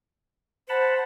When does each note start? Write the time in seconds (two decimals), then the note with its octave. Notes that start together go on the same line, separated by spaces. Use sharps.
0.69 C5 F#5 A5 B5